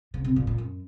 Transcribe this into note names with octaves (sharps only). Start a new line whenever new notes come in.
C#3
C3
A#2
A#2
F#2